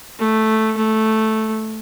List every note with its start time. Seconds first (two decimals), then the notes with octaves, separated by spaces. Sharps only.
0.19 A3
0.77 A3